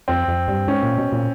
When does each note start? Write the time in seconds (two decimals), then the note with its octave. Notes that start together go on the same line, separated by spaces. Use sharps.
0.08 F2 C4
0.28 F2
0.48 G2
0.67 G#2 C#4
0.83 A#2
0.98 B2
1.12 A#2